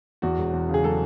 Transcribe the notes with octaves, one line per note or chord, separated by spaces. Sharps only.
E2 F#4
E1
E2
C#3
G#4
F#3 A4